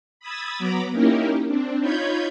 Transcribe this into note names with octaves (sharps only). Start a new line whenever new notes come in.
B5 D#6 E6 G#6 A6
F#3 B3 A#5 B5 D6
A#3 C#4 D#4 E4 G4 A#4
C4 D4
D#4 F4 C#5 B5 G6 G#6